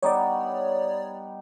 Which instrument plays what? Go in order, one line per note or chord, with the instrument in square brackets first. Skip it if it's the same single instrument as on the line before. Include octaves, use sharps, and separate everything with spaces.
[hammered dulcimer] G3 B3 D#4 [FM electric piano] C#5 D5